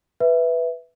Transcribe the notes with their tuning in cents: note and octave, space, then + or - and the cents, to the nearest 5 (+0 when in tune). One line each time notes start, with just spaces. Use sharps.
B4 +0 E5 +0